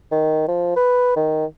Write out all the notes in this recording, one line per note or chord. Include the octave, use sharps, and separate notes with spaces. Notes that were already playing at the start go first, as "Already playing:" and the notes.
D#3
F3
B4
D#3